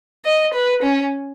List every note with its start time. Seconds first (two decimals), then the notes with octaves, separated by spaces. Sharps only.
0.25 D#5
0.53 B4
0.82 C#4